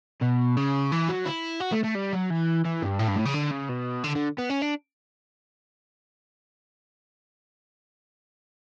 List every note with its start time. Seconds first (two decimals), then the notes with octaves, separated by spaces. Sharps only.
0.22 B2
0.57 C#3
0.92 E3
1.09 F#3
1.26 E4
1.61 F#4
1.72 A3
1.84 A3
1.95 G3
2.13 F#3
2.31 E3
2.65 E3
2.82 G2
2.99 A2
3.08 G2
3.16 A2
3.26 C#3
3.34 D3
3.51 C#3
3.69 B2
4.04 D3
4.15 D3
4.39 B3
4.50 C#4
4.62 D4